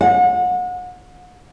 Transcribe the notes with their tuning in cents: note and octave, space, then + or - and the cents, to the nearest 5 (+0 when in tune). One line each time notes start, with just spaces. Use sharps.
F#5 -35